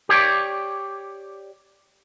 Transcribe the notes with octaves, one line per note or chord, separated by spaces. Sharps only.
G4 C#5 D5